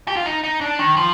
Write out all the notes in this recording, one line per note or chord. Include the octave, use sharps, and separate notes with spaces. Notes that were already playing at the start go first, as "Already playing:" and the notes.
G4
F4
D#4
D#4
D4
D#3
F3